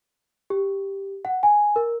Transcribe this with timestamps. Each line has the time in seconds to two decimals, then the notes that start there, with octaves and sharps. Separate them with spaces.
0.50 G4
1.25 F#5
1.43 G#5
1.76 A#4